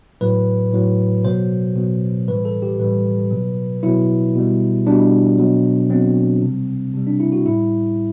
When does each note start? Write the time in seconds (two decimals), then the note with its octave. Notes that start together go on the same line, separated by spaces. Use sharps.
0.21 A2 F#3 B4
0.73 A2 F#3
1.25 B2 F#3 C5
1.76 B2 F#3
2.28 A2 E3 G3 B4
2.45 A4
2.62 G4
2.79 A2 E3 G3 B4
3.31 B2 F#3
3.83 B2 F#3 E4
4.35 B2 G3
4.87 B2 G3 D4
5.38 B2 F#3
5.90 B2 F#3 C4
6.42 C3 G3
6.94 C3 G3
7.07 D4
7.20 E4
7.32 F#4
7.46 A2 G3 E4